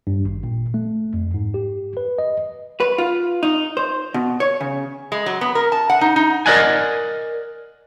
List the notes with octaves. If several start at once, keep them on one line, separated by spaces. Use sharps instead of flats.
G2
G#1
A#2
A3
F2
G#2
G4
B4
D#5
B4
F4
D#4
C5
B2
C#5
C#3
G#3
F#3
B3
A#4
A5
F#5
D#4
D#4
A#4 D5 D#5 F#5 G#5